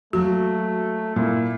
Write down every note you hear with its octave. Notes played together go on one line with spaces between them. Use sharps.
F#3 A3 A#3 F#4
A#2 E4